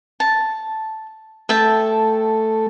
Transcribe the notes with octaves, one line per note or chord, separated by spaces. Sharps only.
A5
A3 A4 E5 G5 A5